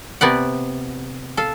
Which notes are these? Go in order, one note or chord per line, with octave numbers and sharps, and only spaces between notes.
C3 B3 D5 F#5
A4 F5